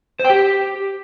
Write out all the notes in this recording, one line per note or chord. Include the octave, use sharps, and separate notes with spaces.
C5
G5
G4